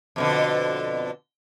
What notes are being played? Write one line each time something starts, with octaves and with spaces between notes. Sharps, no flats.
F2 B2 D3